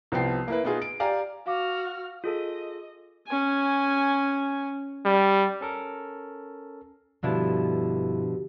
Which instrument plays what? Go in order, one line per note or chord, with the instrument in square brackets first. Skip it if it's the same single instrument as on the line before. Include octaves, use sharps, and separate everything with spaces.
[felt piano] C2 F3 B3 G5 C7
A#3 E4 B4
B2 B3 D#4 F4 G#4
D7
G4 D5 F5 G#5 A#5
[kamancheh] F#4 F6 [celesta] F5 D6
[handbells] F4 G#4 A4 [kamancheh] D#5
[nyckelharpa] C#4 G#5
[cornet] G3
[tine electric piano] C#4 A4 A#4
[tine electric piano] G2 D4 E4 [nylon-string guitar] B2 D3 F3 [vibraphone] F#4 G4